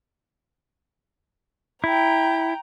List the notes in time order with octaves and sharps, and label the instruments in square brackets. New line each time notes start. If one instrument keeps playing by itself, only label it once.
[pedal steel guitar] E4 [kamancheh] G5 A#5